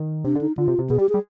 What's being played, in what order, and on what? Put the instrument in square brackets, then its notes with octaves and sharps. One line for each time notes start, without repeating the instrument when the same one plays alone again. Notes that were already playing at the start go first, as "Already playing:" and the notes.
Already playing: [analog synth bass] D#3
[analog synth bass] C3 [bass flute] D4
[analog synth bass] D3
[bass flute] D#4
[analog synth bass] D3 [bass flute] F4
[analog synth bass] C3
C3
[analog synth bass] B2 [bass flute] G#4
[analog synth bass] G3 [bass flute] G4
[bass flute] G#4
[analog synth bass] G3